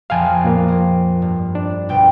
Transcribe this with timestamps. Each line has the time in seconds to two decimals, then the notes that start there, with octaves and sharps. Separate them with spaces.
0.10 A#1 F2 F3 F5 G#5 A5
0.44 A#2 A#3
0.68 C4
1.22 G2
1.55 D4
1.89 C2 B2 G5